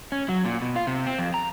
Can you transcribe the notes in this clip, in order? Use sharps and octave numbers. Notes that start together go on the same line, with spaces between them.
C#4
F#3
A#2
B2
F4
C3
C4
F2
A#5